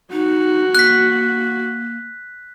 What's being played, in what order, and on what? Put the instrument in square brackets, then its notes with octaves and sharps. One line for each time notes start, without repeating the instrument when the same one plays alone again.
[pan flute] D#4 [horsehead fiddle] F#4
[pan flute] A#3 [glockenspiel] F#6 B6